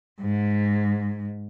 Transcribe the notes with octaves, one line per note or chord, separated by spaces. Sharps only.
G#2